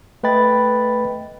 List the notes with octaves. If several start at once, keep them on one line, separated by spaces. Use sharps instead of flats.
A3 B4 D#5 G5 B5 A6